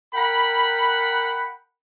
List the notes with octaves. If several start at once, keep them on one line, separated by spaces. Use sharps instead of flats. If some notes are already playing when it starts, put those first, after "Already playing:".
A#4 F#5 G5 B5